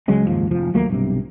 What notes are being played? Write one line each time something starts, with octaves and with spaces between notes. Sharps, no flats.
C#2 F#3 G#3 C#4
F#1 D#2 G#2 F3
F1 F3
D#2 F#3 A3 A#3
B1 G2 C3